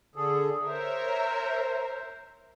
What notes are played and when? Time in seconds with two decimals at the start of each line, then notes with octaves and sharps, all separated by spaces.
0.16 D3 G#4 A4
0.67 A#4 C5 C#5 E5